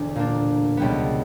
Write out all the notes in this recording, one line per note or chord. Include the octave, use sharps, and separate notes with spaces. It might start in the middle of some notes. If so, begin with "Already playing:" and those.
Already playing: E1 D2 D3
A#2 A#3 D4
C#2 B2 G3 B3